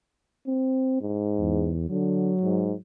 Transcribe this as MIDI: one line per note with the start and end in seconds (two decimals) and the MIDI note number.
0.47 0.97 60
1.01 1.74 44
1.39 1.87 40
1.89 2.35 50
1.89 2.80 54
2.41 2.72 44